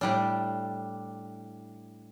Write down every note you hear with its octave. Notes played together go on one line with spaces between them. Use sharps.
A2 G3 D4